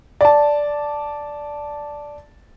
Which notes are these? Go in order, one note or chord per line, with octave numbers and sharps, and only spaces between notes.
D5 A5